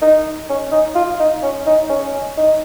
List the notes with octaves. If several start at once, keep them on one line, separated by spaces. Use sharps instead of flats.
D#4
C#4
D#4
F4
D#4
C#4
D#4
C#4
D#4